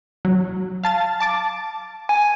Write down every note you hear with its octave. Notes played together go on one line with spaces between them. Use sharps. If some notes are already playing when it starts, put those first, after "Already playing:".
F#3
F5 A5 A6
A5 D6 A6
G#5